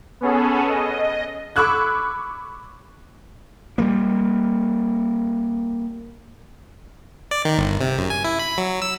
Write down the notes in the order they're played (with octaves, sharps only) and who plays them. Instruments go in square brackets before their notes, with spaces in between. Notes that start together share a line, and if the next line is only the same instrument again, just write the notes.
[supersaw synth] B3 C#4 G#4 A4
D#5
[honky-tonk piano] B5 C#6 D6 E6 F#6 G#6
[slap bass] G3 G#3 A#3
[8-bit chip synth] D5
D#3
G1
C3
F#2
G#5
E4
B5
F#3
E6